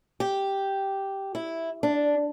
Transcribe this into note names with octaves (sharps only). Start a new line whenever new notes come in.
G4
E4
D4